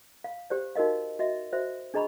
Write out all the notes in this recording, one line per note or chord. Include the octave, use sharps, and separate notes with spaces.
F5
G4 C5 D5
D#4 F#4 A#4 D#5 F5
F#4 D#5 E5
F#4 C5 E5
D4 G#4 D#5 A#5 B5 C#6